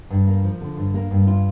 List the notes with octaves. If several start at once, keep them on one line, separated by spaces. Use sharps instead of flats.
G2
A#3
F3
D3
G2
A#3
G2
F4